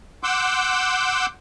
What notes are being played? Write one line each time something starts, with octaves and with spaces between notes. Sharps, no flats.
F#5 C6 D6 E6 G6